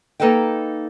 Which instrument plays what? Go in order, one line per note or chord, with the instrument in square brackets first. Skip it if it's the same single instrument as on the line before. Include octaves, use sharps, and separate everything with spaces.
[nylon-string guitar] A#3 D#4 A4 B4 D#5 G5